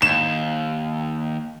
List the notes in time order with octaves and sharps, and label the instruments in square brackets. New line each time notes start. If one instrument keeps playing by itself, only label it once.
[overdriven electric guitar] D#2 [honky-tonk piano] E7